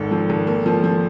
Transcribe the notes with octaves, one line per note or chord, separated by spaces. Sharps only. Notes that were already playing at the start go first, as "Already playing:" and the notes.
Already playing: G#1 G#2 A4
F3
G#1
A#3
F3
F3